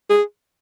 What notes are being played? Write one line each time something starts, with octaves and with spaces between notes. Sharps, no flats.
G#4